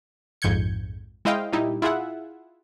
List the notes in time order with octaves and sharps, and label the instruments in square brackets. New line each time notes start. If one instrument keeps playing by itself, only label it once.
[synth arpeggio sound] A#1 F2 G#2 G6 G#6 C#7
G#3 E4 C5 D#5 F5 G5
A#2 G3 D#4 E4 G4
E4 F4 G#4 E5 F#5